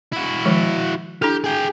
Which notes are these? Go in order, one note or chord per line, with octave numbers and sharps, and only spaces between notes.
E4 F#4
D#3 F3 G#3
D4 E4 G4 A4
G#4 G5